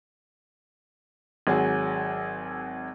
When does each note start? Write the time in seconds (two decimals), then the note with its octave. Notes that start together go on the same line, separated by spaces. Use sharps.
1.47 G#1 F#3 G#4